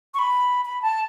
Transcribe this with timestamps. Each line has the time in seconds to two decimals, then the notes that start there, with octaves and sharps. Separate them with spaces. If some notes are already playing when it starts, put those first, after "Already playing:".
0.14 C#6
0.19 B5
0.65 B5
0.82 A5